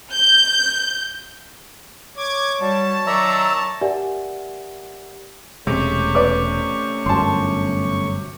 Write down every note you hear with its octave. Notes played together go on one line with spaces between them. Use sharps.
G6
C#5 D6 G#6
F#3 G3 A5
D#3 F#3 D5 E5 A#5 C#6
G4 A#4 D5 E5 F#5 G#5
E1 C3 G#3 A3 C#4 C#6
B4 D5 D6
G1 F#2 A5 C6